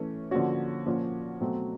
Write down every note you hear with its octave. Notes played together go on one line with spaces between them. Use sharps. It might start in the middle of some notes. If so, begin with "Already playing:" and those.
Already playing: E3 A3 C#4
D3 F3 A#3 C#4 F#4
A#2 F3 A#3 C#4
B2 F#3 A3 C4